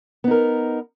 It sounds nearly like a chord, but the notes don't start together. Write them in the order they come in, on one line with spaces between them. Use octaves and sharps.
B3 D#4 A#4